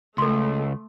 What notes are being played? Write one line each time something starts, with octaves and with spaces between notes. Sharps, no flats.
C#2 A3 A4 C6